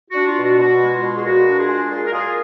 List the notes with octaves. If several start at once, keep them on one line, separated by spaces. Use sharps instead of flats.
F#4
D4
F4
B2
F#4
B2 F#4
G#3
F4
B2
G#4
A#2 F#4
D4
F4 G#4
G#3
A#2 F4 G#4
A#4
A#2 F4 G#4